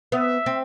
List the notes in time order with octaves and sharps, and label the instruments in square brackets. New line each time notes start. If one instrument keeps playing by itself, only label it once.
[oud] B3 [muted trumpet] E5
[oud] C4